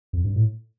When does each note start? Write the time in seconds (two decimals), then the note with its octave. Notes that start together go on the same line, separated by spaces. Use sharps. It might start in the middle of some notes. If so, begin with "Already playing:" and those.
0.13 F2
0.25 G2
0.36 A2